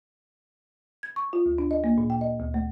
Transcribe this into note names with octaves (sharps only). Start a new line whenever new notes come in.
G#6
C#6
F4
D2
D4
D#5
A#3
A#2
G5
D#5
D2
A3